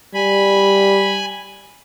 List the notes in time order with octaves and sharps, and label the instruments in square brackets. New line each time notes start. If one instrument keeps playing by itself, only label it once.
[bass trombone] G3 [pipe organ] G#5 B5